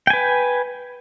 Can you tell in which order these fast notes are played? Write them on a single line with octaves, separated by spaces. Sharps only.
G5 G#5 B4